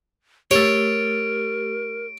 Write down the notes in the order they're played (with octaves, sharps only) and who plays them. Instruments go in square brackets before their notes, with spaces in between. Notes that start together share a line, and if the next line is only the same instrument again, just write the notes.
[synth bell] A3 G4 [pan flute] A#4 [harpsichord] C#5 [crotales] D7